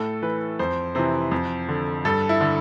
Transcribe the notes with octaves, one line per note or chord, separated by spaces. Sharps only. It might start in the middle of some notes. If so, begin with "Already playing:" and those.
Already playing: A2 A4
E3 B4
F2 C5
C3 E3 C5
F2
D3
G2 A4
E4
D3